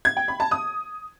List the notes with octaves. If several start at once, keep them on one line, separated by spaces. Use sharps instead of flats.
G#6
G5
B5
A5
D#6